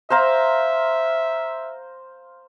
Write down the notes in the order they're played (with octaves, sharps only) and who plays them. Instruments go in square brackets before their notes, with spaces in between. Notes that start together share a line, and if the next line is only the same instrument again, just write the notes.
[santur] C5 F5 A#5 [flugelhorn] E5